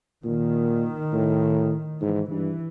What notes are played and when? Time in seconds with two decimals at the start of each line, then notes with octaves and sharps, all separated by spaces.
0.25 A#2 D#3
1.13 A2
2.01 G#2 E3
2.30 G2 E3